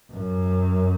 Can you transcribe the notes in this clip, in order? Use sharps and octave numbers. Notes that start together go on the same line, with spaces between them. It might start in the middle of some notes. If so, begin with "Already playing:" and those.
F#2